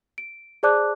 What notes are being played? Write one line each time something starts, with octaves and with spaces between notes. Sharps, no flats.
D7
G#4 C5 D5 A5 D6 F#6